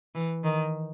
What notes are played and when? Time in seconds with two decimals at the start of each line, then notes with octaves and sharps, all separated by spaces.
0.15 E3
0.44 D#3